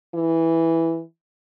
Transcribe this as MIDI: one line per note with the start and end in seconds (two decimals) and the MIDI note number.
0.14 1.01 52